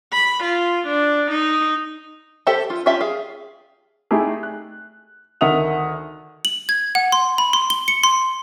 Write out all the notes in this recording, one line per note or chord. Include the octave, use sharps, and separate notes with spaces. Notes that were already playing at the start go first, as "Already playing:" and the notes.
B5
F4
D4
D#4
G4 A4 C5 E5 A5
F4
C#4 F4 G4 E5 A5
G#4 F5
A3 D#4 E4 G4 G#4
F#6
D2 D#3 E5 F#5 D#6 F7
F#7
G#6
F#5
C6
B5
C6
G7
C#7
C6